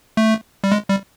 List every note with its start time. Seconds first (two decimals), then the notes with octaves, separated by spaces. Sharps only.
0.17 A3
0.64 G3
0.72 G#3
0.90 G3